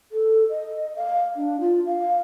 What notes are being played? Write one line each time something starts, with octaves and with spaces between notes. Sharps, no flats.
A4
D#5
F5
D4
F4
F5